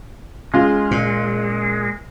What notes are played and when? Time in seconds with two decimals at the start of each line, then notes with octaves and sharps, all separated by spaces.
0.54 C#3 G#3 F4
0.91 A#2